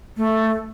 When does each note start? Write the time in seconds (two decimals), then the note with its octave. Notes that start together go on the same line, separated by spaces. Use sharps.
0.17 A3